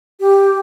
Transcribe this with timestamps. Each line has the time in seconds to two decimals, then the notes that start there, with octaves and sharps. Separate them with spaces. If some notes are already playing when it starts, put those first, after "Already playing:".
0.20 G4